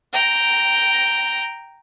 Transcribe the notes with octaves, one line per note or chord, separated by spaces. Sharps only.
G5 A#5